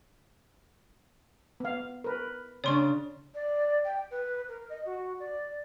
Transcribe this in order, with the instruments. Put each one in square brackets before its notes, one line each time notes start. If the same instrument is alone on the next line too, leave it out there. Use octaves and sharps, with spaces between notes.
[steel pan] B3 F5
A#4 B4
[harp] C#3 D4 [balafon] C#5 C6 C#6
[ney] D5
G5
B4
A#4
D#5
F#4
D5